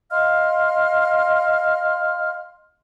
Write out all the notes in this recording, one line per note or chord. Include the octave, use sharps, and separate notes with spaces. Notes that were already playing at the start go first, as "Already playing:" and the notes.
D#5 F5 C6 F6